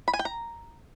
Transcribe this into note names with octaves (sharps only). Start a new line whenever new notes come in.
B5
G#5
G5
A#5